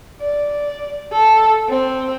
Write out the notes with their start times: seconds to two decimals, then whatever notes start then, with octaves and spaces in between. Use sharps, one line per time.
0.21 D5
1.12 A4
1.69 C4